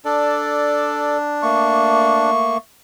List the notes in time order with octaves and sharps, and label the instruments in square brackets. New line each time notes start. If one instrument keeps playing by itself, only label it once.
[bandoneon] D4 [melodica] A4 D5
[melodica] A3 A#3 C#6